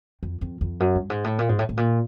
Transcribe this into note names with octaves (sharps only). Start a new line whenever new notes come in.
F2
F2
F2
F#2
G2
G#2
A2
A#2
G#2
A2
A2
A#2